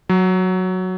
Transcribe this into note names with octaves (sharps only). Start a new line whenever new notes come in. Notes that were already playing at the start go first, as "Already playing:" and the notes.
F#3